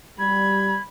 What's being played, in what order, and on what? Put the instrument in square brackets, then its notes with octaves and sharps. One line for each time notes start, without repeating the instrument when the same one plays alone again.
[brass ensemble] G3 [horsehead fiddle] B5 [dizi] G#6